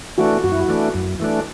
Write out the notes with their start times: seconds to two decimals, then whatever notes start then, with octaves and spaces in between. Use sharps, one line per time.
0.18 E3 A3 D4 F#4
0.44 F#2 F#4
0.52 E4
0.60 F#4
0.68 E3 A3 D4
0.94 F#2
1.20 E3 A3 D4